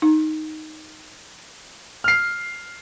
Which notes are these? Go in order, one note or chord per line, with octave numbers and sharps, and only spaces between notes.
D#4
F6 C7